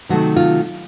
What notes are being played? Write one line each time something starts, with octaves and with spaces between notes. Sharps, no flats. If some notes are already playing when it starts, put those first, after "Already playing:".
C3 D#3 F#3 A3 F#4
F4